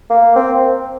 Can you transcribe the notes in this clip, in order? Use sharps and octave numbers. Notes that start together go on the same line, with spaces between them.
A#3
C4